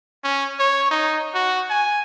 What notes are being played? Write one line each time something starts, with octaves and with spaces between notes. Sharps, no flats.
C#4
C#5
D#4
F#4
G#5